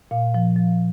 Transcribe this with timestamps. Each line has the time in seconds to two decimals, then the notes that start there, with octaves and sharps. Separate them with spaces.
0.11 A#2 F5
0.34 F3
0.56 F3